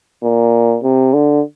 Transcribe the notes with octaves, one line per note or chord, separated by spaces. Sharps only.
A#2
C3
D3